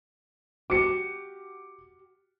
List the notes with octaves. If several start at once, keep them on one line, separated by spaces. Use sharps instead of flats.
F#4 G4 D6 C#7